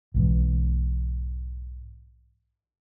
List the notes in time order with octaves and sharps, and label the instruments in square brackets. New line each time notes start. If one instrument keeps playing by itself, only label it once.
[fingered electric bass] B1 G#2 E3